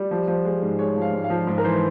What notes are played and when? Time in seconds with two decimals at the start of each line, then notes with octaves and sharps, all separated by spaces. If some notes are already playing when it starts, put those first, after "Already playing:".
Already playing: G3
0.11 F3
0.28 F3
0.45 G#3
0.62 G#2
0.79 G#3 C#5
0.96 F3
1.02 F5
1.13 G#2
1.24 F5
1.30 F3
1.47 G#2
1.58 A#4
1.64 E3 C5